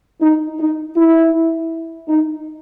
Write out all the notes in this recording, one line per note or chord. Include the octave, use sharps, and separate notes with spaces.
D#4
D#4
E4
D#4